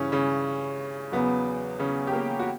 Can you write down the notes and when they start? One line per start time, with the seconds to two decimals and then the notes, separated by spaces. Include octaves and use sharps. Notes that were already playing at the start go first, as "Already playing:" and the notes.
Already playing: G2 C#3 E3 C#4
0.12 C#3 C#4
1.12 E2 C#3 F#3 B3
1.79 C#3 C#4
2.07 G4
2.12 A#3 A#4
2.39 F#4